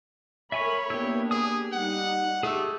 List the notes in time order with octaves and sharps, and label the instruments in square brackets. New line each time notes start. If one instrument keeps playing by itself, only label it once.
[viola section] A#4 B5 [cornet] C#5 [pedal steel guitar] E5 G#5 C#6
[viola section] A#3 B3 D4 [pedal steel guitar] E4 G4
[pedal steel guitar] G4 D#6 [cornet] G#4
[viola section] G3 D#4 [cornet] F#5
[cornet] A3 [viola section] G4 [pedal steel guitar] G#4 E6